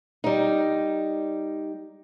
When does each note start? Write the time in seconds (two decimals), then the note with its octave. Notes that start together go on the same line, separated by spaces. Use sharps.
0.24 G3 D#4